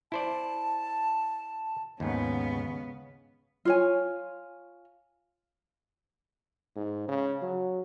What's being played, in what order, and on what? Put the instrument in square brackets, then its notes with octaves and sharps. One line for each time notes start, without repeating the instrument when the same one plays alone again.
[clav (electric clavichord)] E4 C5 D5 [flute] A5
[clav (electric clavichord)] D#2 G#2 [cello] C#3 B3
[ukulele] F4 C#5 G#5
[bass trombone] G#2
C#3
F#3